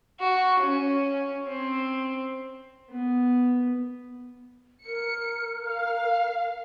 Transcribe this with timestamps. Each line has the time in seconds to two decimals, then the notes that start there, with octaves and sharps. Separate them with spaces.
0.19 F#4
0.59 C#4
1.47 C4
2.90 B3
4.85 A#4 C#7
5.68 F5